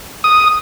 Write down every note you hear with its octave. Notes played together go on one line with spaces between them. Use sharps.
D#6